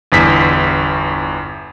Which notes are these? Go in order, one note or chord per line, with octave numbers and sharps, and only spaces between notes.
G1 E2 B6